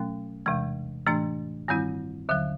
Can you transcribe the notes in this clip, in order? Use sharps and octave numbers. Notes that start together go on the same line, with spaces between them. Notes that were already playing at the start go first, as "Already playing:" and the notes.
Already playing: B2 F#3 A3 C#4
E2 C3 E3 G#3
A2 E3 A3 D4
G2 D#3 G3 C4 E4
D#2 D3 F#3